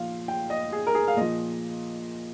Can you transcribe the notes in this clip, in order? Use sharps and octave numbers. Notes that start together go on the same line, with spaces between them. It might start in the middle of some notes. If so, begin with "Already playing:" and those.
Already playing: A#2 F3 F5
G5
D#5
G#4
A#4
G#4
F5
A#2 F3 D#5